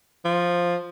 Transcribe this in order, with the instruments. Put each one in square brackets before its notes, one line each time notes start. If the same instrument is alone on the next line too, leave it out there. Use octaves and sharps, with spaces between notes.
[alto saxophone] F3